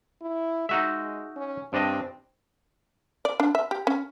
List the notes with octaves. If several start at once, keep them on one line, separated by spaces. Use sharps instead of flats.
E4
G#3 D#4 F#4 E5
C#4
G2 C4 D4 D#5
D5
D4
E5
G4
C#4